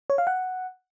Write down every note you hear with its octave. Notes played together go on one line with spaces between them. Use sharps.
C#5
F5
F#5